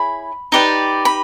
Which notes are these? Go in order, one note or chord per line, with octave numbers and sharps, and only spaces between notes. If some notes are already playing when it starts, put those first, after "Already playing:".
Already playing: E4 G#4 C#5 B5
D#4 G4 B4 D5
B5